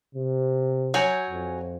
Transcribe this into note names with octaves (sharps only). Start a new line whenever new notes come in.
C3
F#3 C#5 G#5 G6
F2